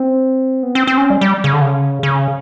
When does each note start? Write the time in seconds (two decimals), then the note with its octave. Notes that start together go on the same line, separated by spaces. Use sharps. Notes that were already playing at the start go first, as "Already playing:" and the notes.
Already playing: C4
0.63 B3
0.75 C4
0.87 C4
0.98 C#4
1.10 G3
1.21 G3
1.44 C#3
1.53 D3
1.61 C#3
2.03 C#3